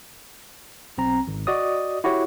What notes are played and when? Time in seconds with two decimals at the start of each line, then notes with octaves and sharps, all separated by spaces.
0.98 B1 C4 A#5
1.27 G#1
1.47 F#4 D5 D#5 D#6
2.04 E4 F#4 G4 C#5 F#5